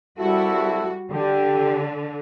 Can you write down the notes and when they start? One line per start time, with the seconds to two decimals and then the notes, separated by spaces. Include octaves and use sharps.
0.18 C2 G3 E4 F#4 A4
1.11 D3 G4